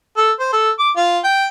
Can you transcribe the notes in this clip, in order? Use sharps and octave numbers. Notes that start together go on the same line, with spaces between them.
A4
C5
A4
D6
F4
G5